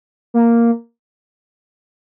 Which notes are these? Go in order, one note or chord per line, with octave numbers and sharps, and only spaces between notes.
A#3